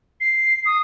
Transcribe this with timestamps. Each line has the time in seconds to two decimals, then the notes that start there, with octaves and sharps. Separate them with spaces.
0.20 C7
0.66 D#6